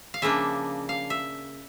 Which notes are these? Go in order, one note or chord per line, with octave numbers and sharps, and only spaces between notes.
F5
C#3 F3 A#3 D4 E5
F5
E5